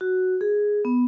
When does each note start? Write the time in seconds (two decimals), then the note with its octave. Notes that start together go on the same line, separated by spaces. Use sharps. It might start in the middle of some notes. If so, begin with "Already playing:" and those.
0.01 F#4
0.41 G#4
0.85 B3